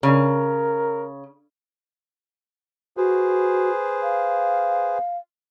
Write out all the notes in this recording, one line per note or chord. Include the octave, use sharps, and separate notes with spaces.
C#3 A#4
F#4 G#4 B4 C5
F5